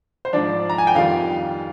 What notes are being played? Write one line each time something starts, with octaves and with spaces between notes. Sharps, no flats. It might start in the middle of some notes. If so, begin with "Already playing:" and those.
C5
G#2 F3 D4 D5
A#5
G#5
G5
F2 D#3 G3 F4 F5